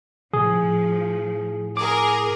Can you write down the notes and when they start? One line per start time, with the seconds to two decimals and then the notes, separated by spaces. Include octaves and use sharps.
0.33 A2 F3 G#4
1.77 G#4 A#4 D6